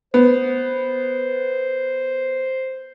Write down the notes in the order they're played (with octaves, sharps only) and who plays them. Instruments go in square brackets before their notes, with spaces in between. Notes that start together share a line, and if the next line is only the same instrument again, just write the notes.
[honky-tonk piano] B3 [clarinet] C5